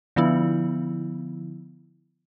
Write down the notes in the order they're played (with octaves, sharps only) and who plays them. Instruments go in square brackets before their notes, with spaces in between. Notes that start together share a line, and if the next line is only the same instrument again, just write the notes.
[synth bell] D3 F3 B3 E4